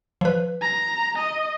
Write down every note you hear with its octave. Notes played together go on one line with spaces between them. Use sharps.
F3 B4
A#5
D#5